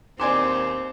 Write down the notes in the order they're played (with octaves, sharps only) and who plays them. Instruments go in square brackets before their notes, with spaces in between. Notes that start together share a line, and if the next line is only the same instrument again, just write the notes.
[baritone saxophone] D#2 [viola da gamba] C4 [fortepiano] D5 G#5 C6 [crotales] D6